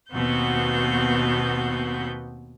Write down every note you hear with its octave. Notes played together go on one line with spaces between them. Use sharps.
D#2 B2 B3 C4 F#4 G6